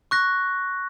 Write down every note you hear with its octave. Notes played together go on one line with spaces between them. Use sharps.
C#6 F#6 A#6